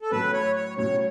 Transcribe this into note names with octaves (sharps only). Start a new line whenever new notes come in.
A4
A2 F#3 C#4 B4
C#5
C#5
A2 F#3 C#4 C#5